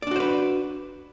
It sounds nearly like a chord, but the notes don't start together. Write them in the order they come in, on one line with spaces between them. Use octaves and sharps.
D5 D4 F#4 C5 B4